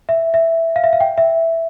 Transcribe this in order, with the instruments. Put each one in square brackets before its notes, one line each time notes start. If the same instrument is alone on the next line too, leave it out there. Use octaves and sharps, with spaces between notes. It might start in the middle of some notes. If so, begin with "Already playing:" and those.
[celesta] E5
E5
F5
E5
F5
G5
E5